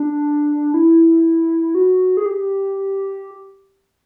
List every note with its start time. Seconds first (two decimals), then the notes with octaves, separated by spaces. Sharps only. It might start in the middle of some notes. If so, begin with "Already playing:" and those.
Already playing: D4
0.74 E4
1.75 F#4
2.17 G#4
2.26 G4